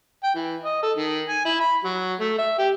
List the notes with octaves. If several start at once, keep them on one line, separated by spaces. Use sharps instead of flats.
G5
E3
D#5
A4
D#3
G#5
E4
B5
F#3
A3
E5
G4